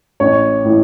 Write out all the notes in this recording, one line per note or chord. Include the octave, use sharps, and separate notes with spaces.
A1 C#5
A2 E3